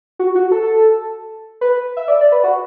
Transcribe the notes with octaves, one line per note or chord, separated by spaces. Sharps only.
F#4
F#4
A4
B4
E5
D5
D5
B4
F#4